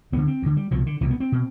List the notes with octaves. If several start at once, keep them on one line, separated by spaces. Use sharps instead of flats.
D2 D3 B3
C4
D2 D3
G3
C2 B2 F3
D3
C2 B2 E3
B3
C4
B2